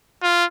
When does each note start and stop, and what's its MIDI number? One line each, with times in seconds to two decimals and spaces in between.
0.22 0.44 65